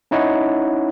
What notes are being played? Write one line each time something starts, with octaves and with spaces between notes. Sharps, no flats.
C#4 D#4 E4 C#5 D#5 F#5